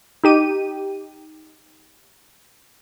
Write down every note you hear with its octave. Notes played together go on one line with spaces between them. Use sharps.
D#4 G4 D#7